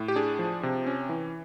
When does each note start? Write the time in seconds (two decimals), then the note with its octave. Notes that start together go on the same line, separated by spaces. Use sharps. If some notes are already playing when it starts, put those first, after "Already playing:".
Already playing: A2
0.08 G4
0.16 D4 G#4
0.39 F3
0.63 C3
0.87 C#4
1.09 E3